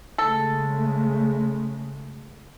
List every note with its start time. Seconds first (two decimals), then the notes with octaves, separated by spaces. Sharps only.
0.18 C#3 G#3 A3 A4